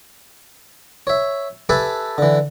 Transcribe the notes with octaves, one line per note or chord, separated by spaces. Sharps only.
C#5 E5
G4 A4 B4 E5 G#5 A5
D3 E3